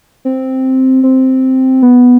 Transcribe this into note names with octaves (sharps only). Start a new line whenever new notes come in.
C4
C4
B3